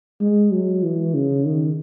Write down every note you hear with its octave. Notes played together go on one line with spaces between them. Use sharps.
G#3
F#3
E3
C#3
D#3